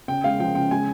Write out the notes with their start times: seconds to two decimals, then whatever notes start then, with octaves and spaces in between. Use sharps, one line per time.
0.08 C#3 G5
0.24 G#3 F5
0.39 F3 G5
0.55 C#3 G5
0.71 G#3 G#5